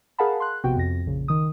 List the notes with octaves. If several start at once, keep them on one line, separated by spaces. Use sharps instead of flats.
G#4 A#4 F5 F#5 A5 B5
C6 F#6
A#1 C3 B3 F#4 G5
F2 A#6
A#1 C#3
D#3 D#6